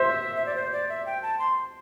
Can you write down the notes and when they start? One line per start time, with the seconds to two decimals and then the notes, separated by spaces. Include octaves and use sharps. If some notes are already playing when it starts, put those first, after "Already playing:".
Already playing: C5 E5
0.36 E5
0.46 D5
0.55 C5
0.72 D5
0.89 E5
1.06 G5
1.23 A5
1.39 C6